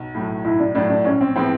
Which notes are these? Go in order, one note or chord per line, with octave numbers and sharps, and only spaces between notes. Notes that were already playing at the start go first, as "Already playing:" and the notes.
Already playing: B1
A2 F#3 A3
B1 E4
D4
A2 F#3 A3 D4
D4
A#1 C#4
C4
A2 F3 G#3 B3 C4